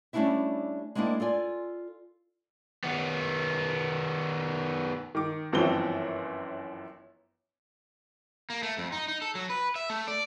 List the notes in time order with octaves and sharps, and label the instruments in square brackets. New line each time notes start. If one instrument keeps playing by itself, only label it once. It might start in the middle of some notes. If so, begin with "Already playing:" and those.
[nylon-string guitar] G3 A3 C#4 D4 E4 E5
G#3 A#3 C4 D4 E4
F4 A4 D5 G#5
[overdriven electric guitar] D#3 B3
[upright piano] D#3 D6
G1 F#2 E3 F3 C4 G7
[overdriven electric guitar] A#3
A3
F2
D#4
D#4
A4
F#3
B4
E5
A3
D5